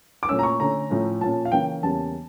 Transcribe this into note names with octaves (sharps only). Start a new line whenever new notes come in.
D6
A#2 A3 C#4 E6
A#5
C#6
D3 A3 C#4 A#5
A2 F3 A3 C#4
A#2 F3 C#4 A5
F5
C#3 E3 A#3 C#4 G5
E2 C#3 G3 A#3 C#4 A5